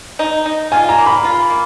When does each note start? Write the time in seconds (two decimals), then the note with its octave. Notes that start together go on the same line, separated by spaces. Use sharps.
0.19 D#4
0.46 D#4
0.72 F4 G#5
0.89 A#5
0.98 A#3
1.06 B5
1.24 F4
1.50 A#3